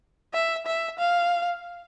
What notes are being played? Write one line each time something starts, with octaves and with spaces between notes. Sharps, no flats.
E5
E5
F5